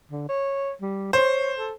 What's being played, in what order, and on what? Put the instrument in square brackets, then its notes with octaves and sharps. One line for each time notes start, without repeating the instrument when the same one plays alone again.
[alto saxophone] D3
C#5
G3
[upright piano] C5 [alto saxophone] C#5
[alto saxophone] A4